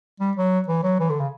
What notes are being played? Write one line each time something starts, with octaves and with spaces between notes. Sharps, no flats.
G3
F#3
E3
F#3
E3
D3
C#3